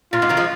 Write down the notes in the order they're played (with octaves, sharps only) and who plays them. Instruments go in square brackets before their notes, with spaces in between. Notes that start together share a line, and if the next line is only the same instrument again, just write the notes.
[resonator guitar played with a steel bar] A#2 [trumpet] F4
[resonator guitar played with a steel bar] G#2
D#3 F#3
F3 G#3